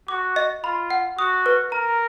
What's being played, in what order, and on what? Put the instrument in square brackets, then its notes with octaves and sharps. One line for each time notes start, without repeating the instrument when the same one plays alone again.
[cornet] F#4 [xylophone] D6
[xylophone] D#5
[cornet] F4 [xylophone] B5
[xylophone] F#5
[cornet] F#4 [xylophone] D#6
[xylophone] B4
[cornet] A#4 [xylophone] A#5